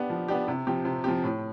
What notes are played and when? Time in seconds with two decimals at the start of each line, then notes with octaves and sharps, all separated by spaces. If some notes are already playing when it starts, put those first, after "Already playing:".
Already playing: B3 D4 G4
0.10 F3
0.28 B3 D4 G4
0.48 C3
0.67 F3 C4 G4
0.85 C3
1.04 F3 C4 G4
1.24 A2